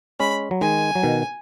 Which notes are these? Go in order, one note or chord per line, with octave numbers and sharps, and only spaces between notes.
G#3 C#4 B5
F#3
D#3 G#3 G#5
F#3
B2 D#3